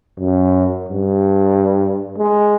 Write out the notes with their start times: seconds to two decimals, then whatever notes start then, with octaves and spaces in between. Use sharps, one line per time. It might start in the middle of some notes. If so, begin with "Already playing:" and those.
0.19 F#2
0.89 G2
2.18 G#3